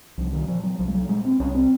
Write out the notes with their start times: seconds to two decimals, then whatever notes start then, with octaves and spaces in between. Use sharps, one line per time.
0.18 C2 F3
0.33 D#3
0.48 A#2 F3
0.64 F#3
0.79 C2 F3
0.88 G#3
0.94 F#3
1.09 A#2 G#3
1.25 C4
1.40 C2 C#4
1.55 C4